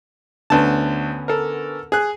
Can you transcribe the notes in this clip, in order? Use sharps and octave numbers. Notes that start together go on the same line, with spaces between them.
D2 D3 B3 C#4 A5
A4 A#4
G#4 F#6